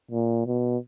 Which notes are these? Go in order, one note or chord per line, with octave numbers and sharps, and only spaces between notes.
A#2
B2